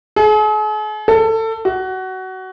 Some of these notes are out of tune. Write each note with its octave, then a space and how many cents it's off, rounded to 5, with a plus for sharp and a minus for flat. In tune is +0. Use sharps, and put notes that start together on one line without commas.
G#4 +45
A4 +25
F#4 +20